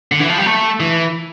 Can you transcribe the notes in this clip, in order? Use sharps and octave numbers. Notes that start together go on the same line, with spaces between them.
D3
E3
F3
G3
A3
E3